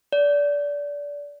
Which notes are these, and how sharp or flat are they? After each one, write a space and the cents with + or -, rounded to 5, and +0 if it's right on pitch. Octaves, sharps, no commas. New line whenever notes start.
D5 -20